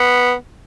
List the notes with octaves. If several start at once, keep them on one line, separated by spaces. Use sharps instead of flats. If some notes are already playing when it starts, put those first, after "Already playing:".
Already playing: B3